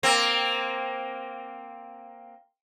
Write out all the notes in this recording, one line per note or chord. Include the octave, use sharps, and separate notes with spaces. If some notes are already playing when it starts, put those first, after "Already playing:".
A#3 C4